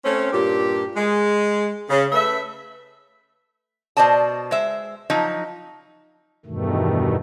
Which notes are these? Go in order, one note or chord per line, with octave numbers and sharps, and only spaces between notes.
A3 C4 C#4
G2 A#2 G4
G#3
C#3
A3 B4 E5
B2 C5 D5 D#5 A5
G#3 C5 E5
F3 F#3 D#4
E2 G2 B2 D#3 A3